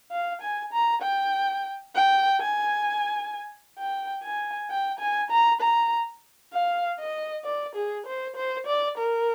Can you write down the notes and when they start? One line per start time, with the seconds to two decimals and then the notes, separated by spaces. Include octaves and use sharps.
0.11 F5
0.42 G#5
0.73 A#5
1.02 G5
1.95 G5
2.41 G#5
3.79 G5
4.24 G#5
4.70 G5
5.00 G#5
5.31 A#5
5.61 A#5
6.53 F5
7.00 D#5
7.45 D5
7.76 G#4
8.06 C5
8.36 C5
8.67 D5
8.98 A#4